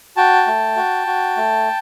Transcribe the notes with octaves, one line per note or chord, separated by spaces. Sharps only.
F#4 G5 A5
A3
F#4
F#4
A3